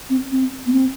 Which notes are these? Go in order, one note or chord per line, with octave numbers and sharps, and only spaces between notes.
C4
C4
B3
C4